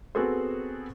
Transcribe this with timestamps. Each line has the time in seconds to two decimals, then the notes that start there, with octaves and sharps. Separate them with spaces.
0.15 B3 C4 F#4 G#4 A4 C5